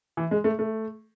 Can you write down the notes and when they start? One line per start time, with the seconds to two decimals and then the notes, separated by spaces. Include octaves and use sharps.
0.17 E3
0.31 G#3
0.44 A3
0.59 A3